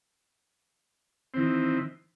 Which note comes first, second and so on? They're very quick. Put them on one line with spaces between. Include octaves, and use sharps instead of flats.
C4 E3 D#3